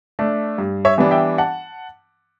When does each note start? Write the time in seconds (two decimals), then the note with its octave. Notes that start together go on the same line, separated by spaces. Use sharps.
0.19 A3 D4
0.58 G2
0.85 C#5 E5
0.98 E3 G3 B3 D4
1.11 E5 G5
1.38 F#5 A5